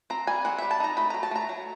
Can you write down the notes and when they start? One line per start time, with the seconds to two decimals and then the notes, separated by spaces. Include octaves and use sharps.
0.10 C4 A#5
0.27 G3 G#5
0.45 C4 F#5
0.58 G3 E5
0.71 A5
0.80 D#4 A#5
0.97 A3 B5
1.10 F#3 A#5
1.23 A5
1.31 A3 A#5
1.49 F#3